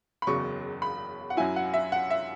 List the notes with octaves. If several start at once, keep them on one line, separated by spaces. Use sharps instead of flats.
B5
F#1 E2 C#3 F#3 C#6
B5
F#5
F#2 F#3 E4 G#5
F#5
E5
F#5
E5